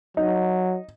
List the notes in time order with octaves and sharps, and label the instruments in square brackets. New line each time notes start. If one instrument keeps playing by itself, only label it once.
[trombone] F#3 [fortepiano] D#4